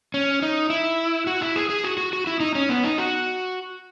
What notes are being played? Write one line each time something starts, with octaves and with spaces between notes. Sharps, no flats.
C#4
D#4
E4
F#4
E4
G#4
G#4
F#4
F#4
F#4
E4
D#4
C#4
B3
D#4
F#4